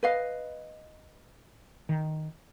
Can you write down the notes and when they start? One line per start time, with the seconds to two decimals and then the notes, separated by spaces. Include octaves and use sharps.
0.03 B4 D#5 F5
1.89 D#3